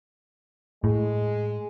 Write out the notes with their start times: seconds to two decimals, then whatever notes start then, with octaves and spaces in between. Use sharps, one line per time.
0.84 A2 G#3